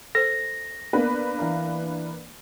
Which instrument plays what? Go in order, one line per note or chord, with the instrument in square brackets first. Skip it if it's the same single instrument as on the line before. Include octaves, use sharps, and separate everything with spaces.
[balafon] A4 C5 [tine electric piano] A#6
[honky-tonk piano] A#3 D4 B4 [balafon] B3 [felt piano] A#4
[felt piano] E3 F5 A#5